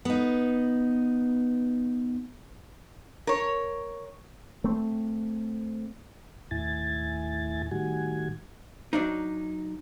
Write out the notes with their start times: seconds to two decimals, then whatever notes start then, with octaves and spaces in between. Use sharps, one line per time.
0.05 B3 D#4
3.27 A#4 C#5
4.64 A3 C4
6.51 D#2 A2 E4 G#5 A6
7.71 A2 D#3 G3 F#4 G#5
8.93 F#3 D4 D#4